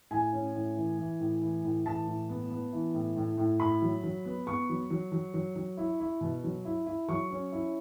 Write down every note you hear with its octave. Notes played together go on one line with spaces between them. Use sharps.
A2 G#5
C#4
A2
E3
E3
A2
E3
A2
E3 A5
A2
B3
B3
E3
A2
A2
A2
E4 B5
F#3
F#3
B3
B3 C#6
F#3
F#3
F#3
F#3
F#3
E4
E4
B2
F#3
E4
E4
F#3 C#6
C#4
E4